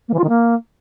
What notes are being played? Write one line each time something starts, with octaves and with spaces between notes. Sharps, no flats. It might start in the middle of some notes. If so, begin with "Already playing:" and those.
A#3
E3
F4
D#3
A#3